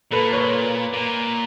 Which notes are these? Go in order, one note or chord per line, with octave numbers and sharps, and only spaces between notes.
A#2 A4 B4
B4 C#5
A#2